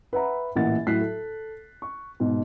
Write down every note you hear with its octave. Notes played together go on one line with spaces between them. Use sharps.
B4 E5 F#5 A#5 B5
A1 A#2 E3 F#5 A6
A2 F#3 E4 F#6 B6 C7
A4
C#6
G#2 B2